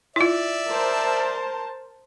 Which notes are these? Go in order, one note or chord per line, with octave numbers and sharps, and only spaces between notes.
E4 F4 D5 E5
A#4 C5 A5